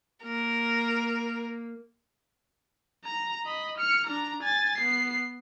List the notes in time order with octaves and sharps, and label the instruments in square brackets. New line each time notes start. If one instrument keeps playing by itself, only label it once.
[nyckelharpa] A#3 [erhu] A#4
[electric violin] A#5
D#5 B5
F6 C#7
D4 A#5
G#5 A6
B3 C7